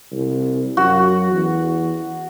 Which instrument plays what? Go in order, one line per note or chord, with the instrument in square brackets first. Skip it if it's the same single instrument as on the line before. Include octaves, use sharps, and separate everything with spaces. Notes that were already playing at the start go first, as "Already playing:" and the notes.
[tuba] C2
[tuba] F#2 [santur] F#4
[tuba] E2